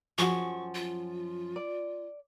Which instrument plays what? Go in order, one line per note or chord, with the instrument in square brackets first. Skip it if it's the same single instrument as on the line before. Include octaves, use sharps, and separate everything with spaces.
[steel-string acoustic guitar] F#2 F3 [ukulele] F#4 G#4 [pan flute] C#6
[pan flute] F4
[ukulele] D5